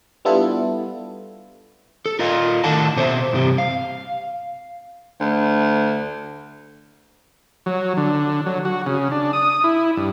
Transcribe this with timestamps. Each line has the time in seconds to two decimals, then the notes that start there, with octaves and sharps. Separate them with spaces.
0.25 G3 B3 D4 E4 F4 A4
2.06 A4
2.19 F4 A#4 D#5 F5
2.64 A2 D#3 A4 F#5 A5
2.96 B2 C5 C#5 E5
3.33 G2 C3 G3 C4
3.58 F5
5.20 D2
7.66 F#3
7.97 D3
8.46 F#3
8.65 F#4
8.86 C#3
9.11 D4
9.33 D#6
9.64 E4
9.97 G2